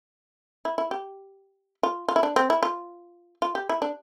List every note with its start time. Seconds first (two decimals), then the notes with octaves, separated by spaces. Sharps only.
0.65 E4
0.78 E4
0.91 G4
1.83 F4
2.08 F4
2.16 E4
2.23 D4
2.36 C4
2.50 E4
2.63 F4
3.42 F4
3.55 G4
3.69 E4
3.82 D4